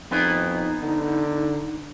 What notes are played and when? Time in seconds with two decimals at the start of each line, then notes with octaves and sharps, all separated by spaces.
0.11 F2 B3 D#4 E4 G#4
0.83 D3